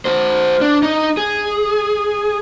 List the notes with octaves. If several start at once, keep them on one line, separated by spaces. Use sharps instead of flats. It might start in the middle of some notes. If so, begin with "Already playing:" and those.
F#4 C5
D4
D#4
G#4